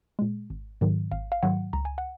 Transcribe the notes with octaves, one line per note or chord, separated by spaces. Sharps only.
A#2 G#3
G#1
G#2 D#3 F#3
G#1 F5
F5
G#2 D#3 F#3 F#5
C#2 A#5
G#5
F#5